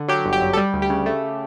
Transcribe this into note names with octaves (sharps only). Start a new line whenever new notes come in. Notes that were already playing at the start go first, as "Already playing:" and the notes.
Already playing: D3
F#3 G4
G1
G4
F#2
A4
G3 G4
D2
G4
C#3
A3